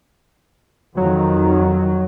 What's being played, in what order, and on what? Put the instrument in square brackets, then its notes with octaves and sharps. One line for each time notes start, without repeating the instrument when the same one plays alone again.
[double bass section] F2 D#3 [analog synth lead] F#3